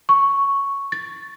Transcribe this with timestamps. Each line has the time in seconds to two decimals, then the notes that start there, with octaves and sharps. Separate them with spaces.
0.09 C#6
0.92 A6